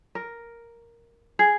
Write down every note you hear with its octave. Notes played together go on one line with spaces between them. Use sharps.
A#4
G#4